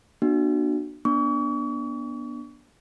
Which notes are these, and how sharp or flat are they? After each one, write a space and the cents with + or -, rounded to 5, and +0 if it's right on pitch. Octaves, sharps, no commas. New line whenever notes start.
B3 -30 D4 +30 F#4 +0
B3 -30 D4 +0 C#6 +40